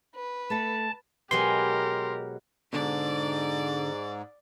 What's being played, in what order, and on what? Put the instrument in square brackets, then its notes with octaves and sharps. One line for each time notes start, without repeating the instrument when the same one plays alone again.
[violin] B4
[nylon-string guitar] A3 A4 [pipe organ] A5
[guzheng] B2 F#3 G#3 [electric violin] G4 A#4 [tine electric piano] C6
[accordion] G#2 [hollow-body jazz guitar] B2 D3 [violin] D5